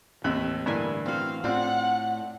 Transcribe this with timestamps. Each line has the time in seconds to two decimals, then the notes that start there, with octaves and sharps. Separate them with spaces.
0.24 D#2 A2 C3 E3 B5
0.66 G2 D3 A#3 E4 G#5
1.06 C4 F#4 F5
1.44 A2 C4 D4 F4 F#5